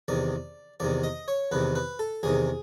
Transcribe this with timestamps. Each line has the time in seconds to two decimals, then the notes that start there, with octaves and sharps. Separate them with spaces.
0.08 E2 C3 D#3 D5
0.80 E2 C3 D#3 D5
1.03 D#5
1.28 C#5
1.52 E2 C3 D#3 B4
1.75 B4
1.99 A4
2.23 E2 C3 D#3 G#4